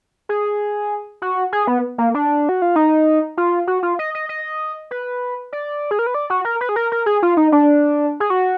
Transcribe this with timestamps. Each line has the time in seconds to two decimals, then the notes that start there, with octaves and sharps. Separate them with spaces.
0.29 G#4
1.22 F#4
1.53 G#4
1.67 B3
1.98 A#3
2.15 D4
2.49 F#4
2.62 F4
2.76 D#4
3.37 F4
3.67 F#4
3.83 F4
3.99 D#5
4.15 D#5
4.29 D#5
4.91 B4
5.53 D5
5.91 G#4
5.99 A#4
6.07 B4
6.14 D5
6.30 F#4
6.45 A#4
6.61 B4
6.69 G#4
6.76 A#4
6.92 A#4
7.06 G#4
7.23 F4
7.37 D#4
7.52 D4
8.20 G#4
8.30 F#4